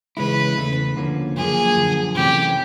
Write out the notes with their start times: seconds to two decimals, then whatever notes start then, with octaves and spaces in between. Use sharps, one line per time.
0.17 C#3 E3 G#3 C#4 E4 B4
0.57 E2 C#3 E3 A3
0.96 D2 D3 F3 A#3 C#4
1.36 F#2 D3 F3 A#3 G#4
1.76 F#2 D3 F3
2.15 C2 C3 E3 A3 C#4 G4